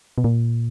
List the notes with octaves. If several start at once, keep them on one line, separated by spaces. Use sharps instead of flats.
B2
A#2